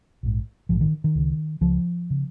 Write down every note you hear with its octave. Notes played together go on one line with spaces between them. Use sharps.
A#1 G#2
A#1 G#2 F3
D#3
D#3
C#2 C#3
C#2 C#3 F3
C#3